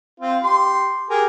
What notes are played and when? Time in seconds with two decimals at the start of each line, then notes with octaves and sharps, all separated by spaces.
0.20 C4 F4
0.43 G4 C6
1.10 G4 G#4 A#4